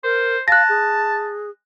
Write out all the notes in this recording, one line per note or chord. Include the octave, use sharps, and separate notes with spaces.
A#4 C5
F5 A5 F#6 A#6
G#4